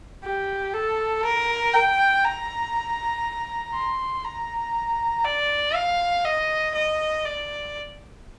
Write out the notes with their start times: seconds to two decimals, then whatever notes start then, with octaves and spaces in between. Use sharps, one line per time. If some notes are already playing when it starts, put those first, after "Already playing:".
0.24 G4
0.74 A4
1.25 A#4
1.74 G5
2.24 A#5
3.74 C6
4.24 A#5
5.25 D5
5.75 F5
6.25 D#5
6.75 D#5
7.25 D5